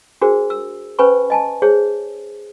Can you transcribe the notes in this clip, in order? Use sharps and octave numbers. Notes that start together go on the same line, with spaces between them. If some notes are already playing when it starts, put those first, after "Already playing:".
D4 F#4 G#4 A#4 C5
E6
C#4 B4 C5 G#5 B5 C#6
D#5 G#5 A5
G#4 C5 C#5